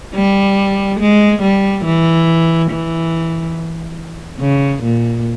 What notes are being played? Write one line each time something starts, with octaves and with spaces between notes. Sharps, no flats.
G3
G#3
G3
E3
E3
C#3
A#2